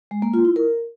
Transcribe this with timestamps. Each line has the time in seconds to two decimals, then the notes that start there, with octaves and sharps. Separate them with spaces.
0.11 G#3
0.22 A#3
0.34 F4
0.45 E4
0.56 A#4